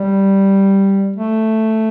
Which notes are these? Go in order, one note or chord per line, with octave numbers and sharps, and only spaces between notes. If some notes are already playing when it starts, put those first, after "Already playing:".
Already playing: G3
A3